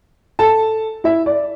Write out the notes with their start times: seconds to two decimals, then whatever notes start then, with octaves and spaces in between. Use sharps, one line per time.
0.39 A4 A5
1.04 E4 E5
1.26 D5